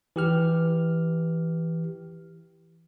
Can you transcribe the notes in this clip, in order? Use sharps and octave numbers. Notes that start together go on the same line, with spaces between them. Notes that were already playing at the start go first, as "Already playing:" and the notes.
E3 G4 F6